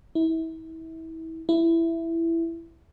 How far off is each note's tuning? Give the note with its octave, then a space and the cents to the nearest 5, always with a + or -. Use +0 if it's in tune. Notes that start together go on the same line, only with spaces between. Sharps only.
E4 -30
E4 +10